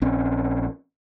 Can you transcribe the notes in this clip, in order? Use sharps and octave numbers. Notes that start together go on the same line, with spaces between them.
A#1 C4 C#4